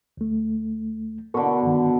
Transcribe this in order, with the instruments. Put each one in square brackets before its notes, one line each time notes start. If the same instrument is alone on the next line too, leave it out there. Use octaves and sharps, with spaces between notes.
[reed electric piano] D2 A3
[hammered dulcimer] B2 D3 [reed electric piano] A4 A#4 C#6
[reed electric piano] G2 D#3